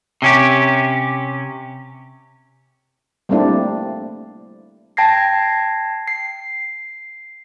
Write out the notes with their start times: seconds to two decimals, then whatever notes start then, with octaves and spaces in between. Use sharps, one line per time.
0.22 C3 C#4 G4
3.29 G3 A3 A#3 C4 D4 E4
4.97 G5 A5 G#6 A#6 C7
6.08 C7